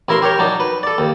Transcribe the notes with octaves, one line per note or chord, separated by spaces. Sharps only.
A1 E4 A#4 E5 C6
G4 A#4 C#5
F#3 D4 D#4
B4
A4 D5
D#2